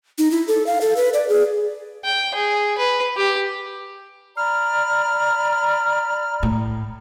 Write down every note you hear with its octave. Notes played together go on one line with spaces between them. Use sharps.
D#4
E4
A4
F5
A4
B4
D5
G#4
G5
G#4
B4
G4
D5 A#5 B5 F6
A2